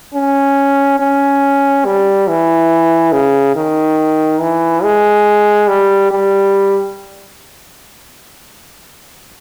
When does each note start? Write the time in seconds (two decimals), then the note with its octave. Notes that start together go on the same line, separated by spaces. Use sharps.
0.14 C#4
0.99 C#4
1.85 G3
2.28 E3
3.12 C#3
3.56 D#3
4.41 E3
4.84 G#3
5.68 G3
6.11 G3